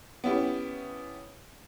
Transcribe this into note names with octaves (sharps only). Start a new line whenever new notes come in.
B3 C#4 E4 G4